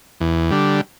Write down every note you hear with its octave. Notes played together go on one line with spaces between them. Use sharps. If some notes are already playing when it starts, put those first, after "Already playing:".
E2
D3 G3